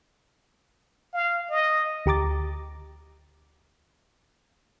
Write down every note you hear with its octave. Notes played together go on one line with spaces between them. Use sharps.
F5
D#5
D2 G4 A#5 D6 A6